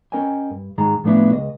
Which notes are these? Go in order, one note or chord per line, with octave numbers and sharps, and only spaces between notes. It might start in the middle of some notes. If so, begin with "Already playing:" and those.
C#4 A#4 D#5 G5 G#5
G2
G#2 D#3 G#3 A#5
A2 F3 A3 B3 D4 E4
C#2 D#5